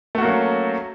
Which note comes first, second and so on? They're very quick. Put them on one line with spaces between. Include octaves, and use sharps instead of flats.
A3 F#4 A#3 F#3 C#4